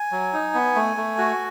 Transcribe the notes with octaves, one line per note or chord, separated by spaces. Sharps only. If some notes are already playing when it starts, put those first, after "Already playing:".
Already playing: G#5
F#3
D#4
B3
A3
A3
F#4